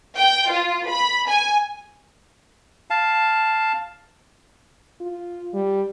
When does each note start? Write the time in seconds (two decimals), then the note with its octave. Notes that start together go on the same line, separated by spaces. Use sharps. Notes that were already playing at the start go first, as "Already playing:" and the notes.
0.16 G5
0.50 F4
0.86 B5
1.28 G#5
2.90 F5 A5
5.01 F4
5.54 G3